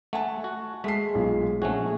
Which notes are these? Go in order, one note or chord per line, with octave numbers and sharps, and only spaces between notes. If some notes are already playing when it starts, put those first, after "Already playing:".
A3 F#5 G#5 A5
F#4
G#3 A3 B6 C7
B1 F4
A#1 A3 C#4 F#4 G#4